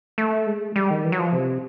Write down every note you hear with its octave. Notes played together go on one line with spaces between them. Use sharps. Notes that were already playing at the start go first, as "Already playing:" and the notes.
A3
G#3
G3
D#3
E3
F#3
F3
C3